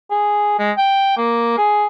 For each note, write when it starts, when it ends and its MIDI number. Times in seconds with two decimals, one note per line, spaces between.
0.11 0.54 68
0.59 0.71 56
0.78 1.14 79
1.17 1.55 58
1.58 1.87 68